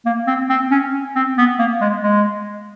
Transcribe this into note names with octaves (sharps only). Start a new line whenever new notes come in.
A#3
C4
C4
C#4
C4
B3
A#3
G#3
G#3